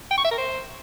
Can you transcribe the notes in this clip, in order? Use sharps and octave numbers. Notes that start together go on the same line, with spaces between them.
G5
C#6
E5
A#4
C5